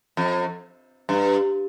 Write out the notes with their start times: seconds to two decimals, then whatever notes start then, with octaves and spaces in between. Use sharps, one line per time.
0.17 F2
1.09 G2